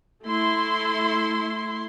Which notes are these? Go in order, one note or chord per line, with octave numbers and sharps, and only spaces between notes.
A3 E4 C6